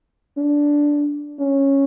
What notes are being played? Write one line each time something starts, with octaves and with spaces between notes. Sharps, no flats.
D4
C#4